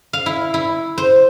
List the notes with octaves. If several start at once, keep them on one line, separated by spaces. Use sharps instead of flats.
F5
E4
E4
C5